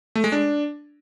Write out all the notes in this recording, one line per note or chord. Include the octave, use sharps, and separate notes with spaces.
A3
G#3
D4